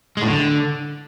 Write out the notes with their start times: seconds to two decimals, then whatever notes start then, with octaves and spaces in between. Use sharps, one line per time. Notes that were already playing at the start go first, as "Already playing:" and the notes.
0.17 G#3
0.22 A2
0.27 D3